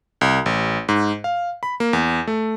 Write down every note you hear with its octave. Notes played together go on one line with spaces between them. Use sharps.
C2
A1
G#2
F5
B5
A#3
E2
A3